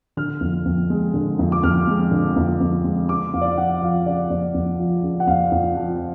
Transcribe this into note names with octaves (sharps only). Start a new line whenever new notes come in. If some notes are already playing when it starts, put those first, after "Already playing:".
D3 F6
F2
F2
G#3
D3
F2
D6
F2 F6
G#3
D3
F2
F2
G#3
C#3 D6
F2 F5
D5
F5
F2 F#5
F3 F5
C#3 D5
F2 D5
F2
F3
C#3
F#5
F2 F5
F2
F3